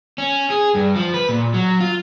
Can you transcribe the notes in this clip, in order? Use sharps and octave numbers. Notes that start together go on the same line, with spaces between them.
C#4
G#4
G2
F3
B4
A#2
F#3
F4